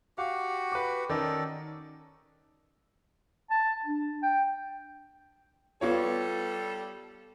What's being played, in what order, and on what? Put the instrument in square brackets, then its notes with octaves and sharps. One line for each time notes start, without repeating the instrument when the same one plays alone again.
[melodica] F#4 G4 F#5 [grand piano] F5
[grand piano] B4 D6
[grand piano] D#3 C#4 D#4 [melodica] A4 D5
[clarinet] A5
D4
G5
[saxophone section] G3 A4 [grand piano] B3 F4 C#5